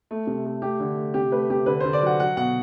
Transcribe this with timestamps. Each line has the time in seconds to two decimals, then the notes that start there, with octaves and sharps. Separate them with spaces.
0.11 A3
0.27 C3
0.45 A3
0.62 A3 G4
0.80 D3
0.97 A3
1.14 C3 G4
1.32 A3 B4
1.50 C3 G4
1.66 D3 B4
1.80 D3 C5
1.93 D5
2.02 F#3 F#5
2.20 F#3 F#5
2.37 B2 F#5